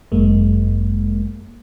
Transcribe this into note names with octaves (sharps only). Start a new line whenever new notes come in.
G1 F#2 G#3 A#3